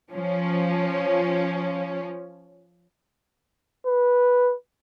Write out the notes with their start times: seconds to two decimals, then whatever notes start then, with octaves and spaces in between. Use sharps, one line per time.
0.12 F3 C#4
3.86 B4